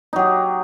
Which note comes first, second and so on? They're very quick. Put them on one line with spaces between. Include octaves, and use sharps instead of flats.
D#4 F#3 G4